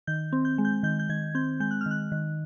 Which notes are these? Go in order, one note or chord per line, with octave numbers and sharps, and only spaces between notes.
D#3 G6
C4
G6
G#3
G6
D#3 G6
G6
D#3 G#6
C4 G6
G#3 G6
F#6
F6
D#3 F#6
D#3